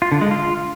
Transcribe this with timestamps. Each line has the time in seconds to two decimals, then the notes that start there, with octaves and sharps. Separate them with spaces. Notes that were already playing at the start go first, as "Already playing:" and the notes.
0.02 F4
0.12 D3
0.21 G#3
0.31 F4